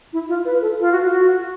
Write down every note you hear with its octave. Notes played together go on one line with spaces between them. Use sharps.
E4
F4
B4
A4
F4
F#4
F#4